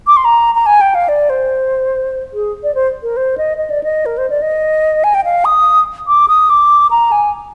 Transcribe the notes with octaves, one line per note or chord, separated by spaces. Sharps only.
D6
C6
A#5
A#5
G#5
G5
F5
D5
C5
G#4
D5
C5
A#4
C5
D#5
D#5
D5
D#5
A#4
C5
D5
D#5
G#5
G5
F5
D#6
D6
D#6
D6
A#5
G#5